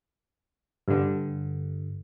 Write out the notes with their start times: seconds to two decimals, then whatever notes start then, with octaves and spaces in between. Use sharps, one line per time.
0.88 G2 D3